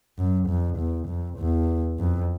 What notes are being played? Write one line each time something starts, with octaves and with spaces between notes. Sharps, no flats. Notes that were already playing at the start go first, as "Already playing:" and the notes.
F#2
F2
E2
F2
E2
F2